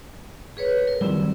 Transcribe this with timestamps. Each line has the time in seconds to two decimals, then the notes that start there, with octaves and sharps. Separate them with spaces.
0.57 G#4 B4 C#5
0.87 A#4
1.01 D#3 F#3 G3 C4 E4